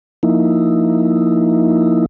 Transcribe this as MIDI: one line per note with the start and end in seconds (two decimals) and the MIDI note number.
0.23 2.06 53
0.23 2.06 58
0.23 2.06 63
0.23 2.06 64